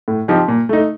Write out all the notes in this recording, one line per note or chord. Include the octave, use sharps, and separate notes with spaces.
A2
F3 C4 D#4 G4
A#2
A3 D#4